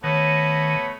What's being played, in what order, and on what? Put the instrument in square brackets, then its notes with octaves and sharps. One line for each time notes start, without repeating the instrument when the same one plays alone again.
[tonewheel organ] D#3 [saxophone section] A3 B3 C#5